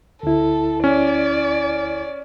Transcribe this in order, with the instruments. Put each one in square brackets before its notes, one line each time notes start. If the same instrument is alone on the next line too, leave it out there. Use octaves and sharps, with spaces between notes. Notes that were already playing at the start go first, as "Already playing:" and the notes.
[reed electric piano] D2 E4 [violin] A4
[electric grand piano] C#4 [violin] D5